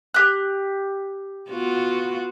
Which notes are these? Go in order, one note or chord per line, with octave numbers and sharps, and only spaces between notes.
G4 F#6
B3 F4 F#4